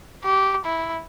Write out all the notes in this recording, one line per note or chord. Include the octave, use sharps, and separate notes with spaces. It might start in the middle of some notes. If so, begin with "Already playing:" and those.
G4
E4